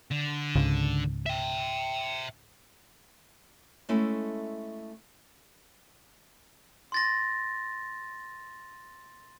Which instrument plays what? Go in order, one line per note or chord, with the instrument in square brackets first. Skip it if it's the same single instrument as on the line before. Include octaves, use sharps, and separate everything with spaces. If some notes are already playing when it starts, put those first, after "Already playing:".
[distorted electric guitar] D3
[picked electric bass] C#2 G#2 C#3
[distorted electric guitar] E5 G5
[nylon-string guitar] G#3 A3 C#4 E4 A4
[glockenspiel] C6 A6 A#6